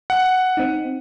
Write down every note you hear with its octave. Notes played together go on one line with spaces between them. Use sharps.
F#5
C4 D#4